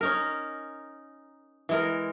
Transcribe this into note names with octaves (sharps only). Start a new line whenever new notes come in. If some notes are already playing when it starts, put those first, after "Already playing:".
C#4 D#4 A#4
E3 G#3 A#4